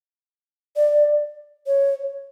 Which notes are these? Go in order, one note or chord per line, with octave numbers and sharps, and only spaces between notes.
D5
C#5